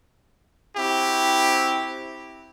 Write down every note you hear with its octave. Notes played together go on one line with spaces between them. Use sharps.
C4 E4 F#4 G4